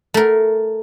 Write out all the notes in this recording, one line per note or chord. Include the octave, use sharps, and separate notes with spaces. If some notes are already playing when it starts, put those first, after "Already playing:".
A3 A#4